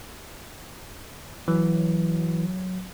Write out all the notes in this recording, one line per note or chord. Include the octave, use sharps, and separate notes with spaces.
E3 F#3